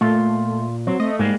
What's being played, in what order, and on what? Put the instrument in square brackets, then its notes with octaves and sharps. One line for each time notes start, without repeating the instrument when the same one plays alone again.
[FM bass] A#2 [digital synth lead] A3 [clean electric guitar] F4
[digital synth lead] F#3 [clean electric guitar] C4
[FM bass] A3 [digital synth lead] D#5
[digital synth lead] G#2 [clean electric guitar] G3 G#3 A#3